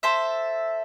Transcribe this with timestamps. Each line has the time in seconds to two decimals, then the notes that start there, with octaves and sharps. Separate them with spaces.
0.03 A4 C5 E5